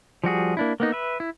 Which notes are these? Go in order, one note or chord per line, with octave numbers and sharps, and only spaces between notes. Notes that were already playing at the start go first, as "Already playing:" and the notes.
F3 G3 F#4 G#4
A#3 D4 E4
A#3 B3 D#4
B4 E5
E4